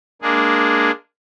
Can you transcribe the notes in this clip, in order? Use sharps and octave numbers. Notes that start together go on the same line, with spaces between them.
G#3 A#3 D4 G#4